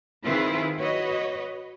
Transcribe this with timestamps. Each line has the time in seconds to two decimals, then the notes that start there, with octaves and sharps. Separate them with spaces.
0.24 D#3 C4 E4 F4 G#4 B4
0.79 F#4 B4 C#5 D#5